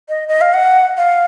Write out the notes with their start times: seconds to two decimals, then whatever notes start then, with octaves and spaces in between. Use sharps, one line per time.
0.09 D#5
0.29 D#5
0.41 F5
0.54 F#5
0.97 F5